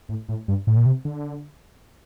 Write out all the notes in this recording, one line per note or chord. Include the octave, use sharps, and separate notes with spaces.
A2
A2
G2
A2
A#2
C3
D3